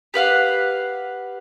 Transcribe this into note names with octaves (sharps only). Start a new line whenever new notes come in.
G4 B4 F5 F#5